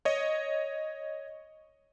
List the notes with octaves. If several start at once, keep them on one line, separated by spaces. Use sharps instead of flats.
C#5 D#5